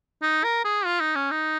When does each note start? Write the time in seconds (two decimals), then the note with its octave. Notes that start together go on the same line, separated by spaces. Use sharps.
0.22 D#4
0.44 A#4
0.64 G#4
0.85 F4
1.00 D#4
1.15 C#4
1.31 D#4